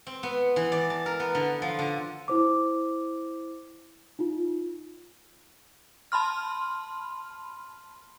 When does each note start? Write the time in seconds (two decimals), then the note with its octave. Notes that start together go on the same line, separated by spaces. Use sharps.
0.07 C4
0.23 B3
0.56 E3
0.72 D5
0.90 A5
1.06 A#4
1.20 B3
1.35 D3
1.62 F3
1.79 D3
2.28 E4 C5 D6
4.19 D#4 F4
6.12 A5 B5 C6 F6